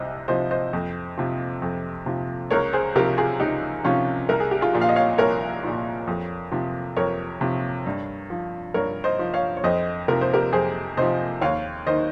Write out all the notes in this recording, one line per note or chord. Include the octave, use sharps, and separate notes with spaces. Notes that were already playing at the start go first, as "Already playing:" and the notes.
Already playing: C2 C3 C5 D#5
C3 F3 C5 D#5
C5 D#5
F2
C3 F3
F2
C3 F3
C#2 A#4 C#5
G#4 C5
C3 F3 G4 A#4
F4 G#4
C#2 D#4 G4
C3 F3 C#4 F4
C2 A#4
G#4
G4
F4 G#4
A#2 F3
F5
D#5
C#5 F5
C2 A#4 C#5
A#2 F3
F2
C3 F3
F2 A#4 C#5
C3 F3
G2
F3
G2 A#4 C#5
C5 D#5
F3
C#5 F5
C#5
F2 C5 D#5
C3 F3 A#4
C5
G4 A#4
F2 G#4 C5
C3 F3 C5 D#5
D#2 C#5 F5
D#3 C5 D#5